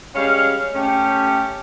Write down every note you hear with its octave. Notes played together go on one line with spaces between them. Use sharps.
G3 G#3 C#4 C#5 F5
A3 C#4 G4